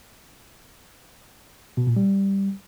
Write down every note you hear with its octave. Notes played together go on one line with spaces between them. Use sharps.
B2
A#2
G3